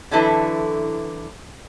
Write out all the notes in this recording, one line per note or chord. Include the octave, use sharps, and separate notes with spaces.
D3 E3 F#3 E4 A4 B4